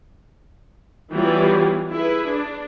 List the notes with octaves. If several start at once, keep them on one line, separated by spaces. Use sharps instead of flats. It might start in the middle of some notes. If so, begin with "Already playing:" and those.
E3 F#3 G3 B3 F4
E4 G#4 B4
D4